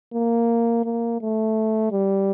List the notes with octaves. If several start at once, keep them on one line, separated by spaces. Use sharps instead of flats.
A#3
A#3
A3
G3